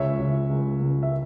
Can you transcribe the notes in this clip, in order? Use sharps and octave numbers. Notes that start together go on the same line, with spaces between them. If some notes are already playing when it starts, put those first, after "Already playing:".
Already playing: C#2 C#5 E5
C#2
C#2
C#2
E5